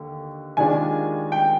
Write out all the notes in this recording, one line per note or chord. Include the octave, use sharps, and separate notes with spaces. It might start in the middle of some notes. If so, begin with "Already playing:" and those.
Already playing: D#2 D3
D#2 D#3 G#3 D4 F4 G#5
G5